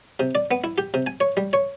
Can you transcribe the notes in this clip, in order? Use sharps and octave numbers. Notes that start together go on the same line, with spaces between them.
C3
D5
B3
E4
G4
C3
G#5
C#5
G3
C#5